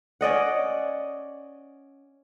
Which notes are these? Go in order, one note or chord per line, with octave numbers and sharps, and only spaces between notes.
C#4 D5 D#5 F#5